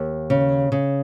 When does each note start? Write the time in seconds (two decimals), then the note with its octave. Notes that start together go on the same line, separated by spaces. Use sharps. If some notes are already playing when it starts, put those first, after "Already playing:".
Already playing: D#2
0.30 C#3
0.72 C#3